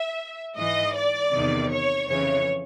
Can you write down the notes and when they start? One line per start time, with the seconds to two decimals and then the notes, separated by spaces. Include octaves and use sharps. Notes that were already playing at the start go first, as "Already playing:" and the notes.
Already playing: E5
0.57 G#2 E3 D#5
0.95 D5
1.33 E2 C3 D#3
1.71 C#5
2.09 F2 C#3 E3 C#5